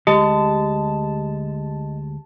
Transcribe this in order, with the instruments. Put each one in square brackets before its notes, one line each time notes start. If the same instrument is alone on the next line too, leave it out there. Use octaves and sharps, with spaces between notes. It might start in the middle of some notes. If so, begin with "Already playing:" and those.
[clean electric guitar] D2 G#3 [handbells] G4 [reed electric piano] D#5 [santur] A5